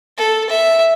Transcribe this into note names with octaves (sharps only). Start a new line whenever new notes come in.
A4
E5